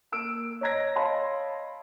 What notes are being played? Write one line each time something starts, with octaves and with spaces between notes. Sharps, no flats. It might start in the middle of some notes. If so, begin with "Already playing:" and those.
A#3 E6 D7
C#5 D#5 A#5 G#6 A#6
C#5 D#5 F5 A5 B5 C6